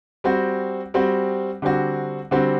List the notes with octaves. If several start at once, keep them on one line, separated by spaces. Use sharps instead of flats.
G3 C4 F#4
G3 C4 F#4
D3 G3 C4 F#4
D3 G3 C4 F#4